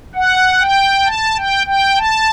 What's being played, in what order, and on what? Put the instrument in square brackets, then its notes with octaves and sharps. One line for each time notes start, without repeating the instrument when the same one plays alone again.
[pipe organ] F#5
G5
A5
G5
G5
A5